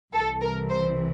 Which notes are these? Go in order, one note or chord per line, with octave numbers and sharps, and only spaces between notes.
C2 C3 E3 A4
A#4
C5